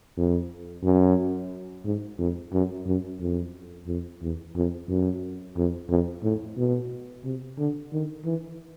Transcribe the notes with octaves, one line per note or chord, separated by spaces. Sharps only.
F2
F#2
G#2
F2
F#2
F#2
F2
F2
E2
F2
F#2
F2
F2
A2
B2
C3
D3
D#3
E3